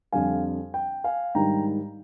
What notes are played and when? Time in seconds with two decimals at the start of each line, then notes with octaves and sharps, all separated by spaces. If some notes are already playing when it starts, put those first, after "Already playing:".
0.12 F2 D3 G3 F5 G#5
0.74 G5
1.04 F5 G#5
1.35 G#2 D#3 G3 D4 G5 A#5